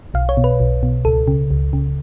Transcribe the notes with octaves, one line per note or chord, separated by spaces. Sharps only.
B1 F5
C#5
B2
B4
B1
B2
C#2 A4
C#3
C#2
C#3